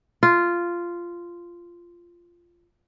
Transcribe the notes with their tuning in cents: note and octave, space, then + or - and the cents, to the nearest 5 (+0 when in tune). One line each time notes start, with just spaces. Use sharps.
F4 -10